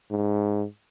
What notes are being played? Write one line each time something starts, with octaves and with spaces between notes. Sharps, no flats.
G#2